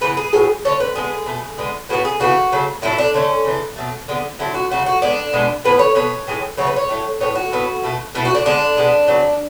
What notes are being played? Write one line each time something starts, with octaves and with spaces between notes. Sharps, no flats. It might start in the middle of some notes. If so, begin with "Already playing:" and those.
C#3 E3 B3 B4
G#4
A2 F#3 B3 G#4
D3 A3 C#5
B4
D3 G#3 B3 G#4
B2 A3
D3 G#3 B3
A2 E3 G#3 B3 F#4
G#4
C#3 E3 B3 F#4
C#3 F#3 A3
A2 F#3 A3 E4
D4
D3 A3 C#4
C#3 E3 A3
B2 F#3 A3
D3 G#3 B3
D3 F#3 A3 E4
F#4
C#3 F#3 A3 F#4
F#4
A2 G#3 B3 D4
B2 G#3 B3
A2 E3 B3 B4
C#5
B2 G#3 B3 C#5
A2 E3 G#3
C#3 F#3 A3 C#5
B4
C#5
A2 F#3 A3
A2 G#3 B3 C#5
F#4
A2 F#3 B3
B2 A3
B2 A3 E4
F#4
D4
D3 G#3 B3 D4
B2 G#3 B3
C#3 F#3 B3